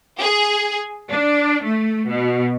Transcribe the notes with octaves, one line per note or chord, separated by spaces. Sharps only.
G#4
D4
A3
B2